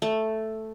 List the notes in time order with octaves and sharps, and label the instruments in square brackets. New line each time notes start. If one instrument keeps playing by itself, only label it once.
[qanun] A3